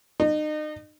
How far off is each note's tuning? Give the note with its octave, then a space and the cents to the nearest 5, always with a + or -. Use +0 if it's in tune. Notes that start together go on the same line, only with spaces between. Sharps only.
D#4 -35